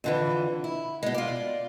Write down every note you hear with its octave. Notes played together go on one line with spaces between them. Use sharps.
F2 D3 E3
E4
B2 G#3
F4 D5